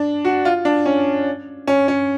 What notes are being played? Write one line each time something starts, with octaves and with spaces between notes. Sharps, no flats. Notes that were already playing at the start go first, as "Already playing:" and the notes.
Already playing: D4
F#4
F4
D4
C#4
C#4
C#4